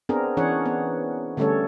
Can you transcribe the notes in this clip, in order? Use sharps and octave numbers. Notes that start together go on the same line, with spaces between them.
B3 C4 D4 G#4 A#4
E3 C#4 D4 G#4 C#5 F#5
B3
D3 G3 A3 C#4 A4 C#5